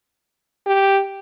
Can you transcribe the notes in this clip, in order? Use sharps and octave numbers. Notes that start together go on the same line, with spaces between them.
G4